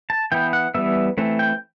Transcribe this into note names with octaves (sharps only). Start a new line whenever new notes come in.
A5
E3 B3 G5
F#5
E3 G3 B3 E5
E3 A3 C4
G5